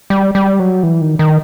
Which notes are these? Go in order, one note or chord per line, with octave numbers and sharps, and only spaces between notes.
G3
G3
F#3
E3
D#3
D#3